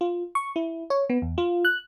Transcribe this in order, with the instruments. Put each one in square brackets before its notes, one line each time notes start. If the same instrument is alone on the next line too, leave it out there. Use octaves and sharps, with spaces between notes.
[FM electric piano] F4
C#6
E4
C#5
B3
E2
F4
F#6